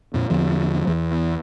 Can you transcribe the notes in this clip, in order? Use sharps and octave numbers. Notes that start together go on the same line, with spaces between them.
F2 A#2
E2 D3 F3
E2 E3